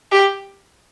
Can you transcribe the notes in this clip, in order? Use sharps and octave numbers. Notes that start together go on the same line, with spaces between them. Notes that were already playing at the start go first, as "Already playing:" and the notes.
G4